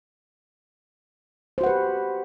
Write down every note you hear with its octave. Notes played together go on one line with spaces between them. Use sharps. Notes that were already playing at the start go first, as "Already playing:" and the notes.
F#4 G4 B4 C5 F#5